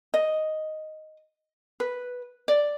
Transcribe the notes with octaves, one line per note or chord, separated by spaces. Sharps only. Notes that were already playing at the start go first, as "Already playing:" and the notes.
D#5
B4
D5